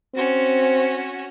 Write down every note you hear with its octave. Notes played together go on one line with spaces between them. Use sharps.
C4 C#4 F#4